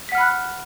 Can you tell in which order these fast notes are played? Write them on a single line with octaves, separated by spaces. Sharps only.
B6 F#5 F6 B5 F#6